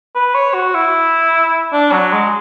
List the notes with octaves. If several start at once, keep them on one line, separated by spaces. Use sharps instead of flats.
B4
C#5
F#4
E4
D4
F#3
G#3